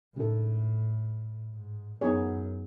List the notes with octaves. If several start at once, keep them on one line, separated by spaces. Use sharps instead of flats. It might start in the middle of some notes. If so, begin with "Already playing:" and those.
A2 C#3 G#3 D#4 A4
G#2
F#2 B3 D#4 G#4 C#5